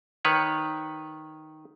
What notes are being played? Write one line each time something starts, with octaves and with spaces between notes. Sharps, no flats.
D#3 B4 C#5